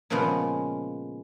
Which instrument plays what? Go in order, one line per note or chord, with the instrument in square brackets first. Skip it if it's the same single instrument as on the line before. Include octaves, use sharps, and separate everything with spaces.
[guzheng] A#2 C#3 F3 G#3 B3